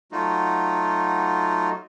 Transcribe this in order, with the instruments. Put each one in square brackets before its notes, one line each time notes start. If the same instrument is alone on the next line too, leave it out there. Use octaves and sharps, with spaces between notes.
[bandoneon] F#3 A3 D#4 F4 F#4